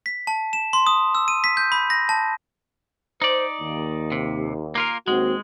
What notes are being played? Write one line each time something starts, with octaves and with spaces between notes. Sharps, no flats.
B6
A5
E7
C6
D#6
E6
D#7
B6
G6
B5
A#6
A5
D#4 C5 D5
D#2
C3
A#3 F4 A#4
D#2 G#3 C4 F#4